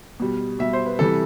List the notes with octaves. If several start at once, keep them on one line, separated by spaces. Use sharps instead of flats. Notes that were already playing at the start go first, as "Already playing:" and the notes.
B2 G3
B2 G3 E5
C5
B4
C3 E3 G3 A4